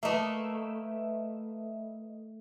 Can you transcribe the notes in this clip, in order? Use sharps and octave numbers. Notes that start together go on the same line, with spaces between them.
A3 A#3 B4 D#5 E5